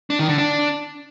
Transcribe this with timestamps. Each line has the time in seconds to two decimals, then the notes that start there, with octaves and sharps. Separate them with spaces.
0.10 D4
0.19 D#3
0.29 D3
0.38 D4